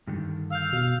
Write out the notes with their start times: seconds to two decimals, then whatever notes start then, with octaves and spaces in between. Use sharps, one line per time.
0.07 G2 D3 D#3
0.50 F5 E6 G6
0.73 B2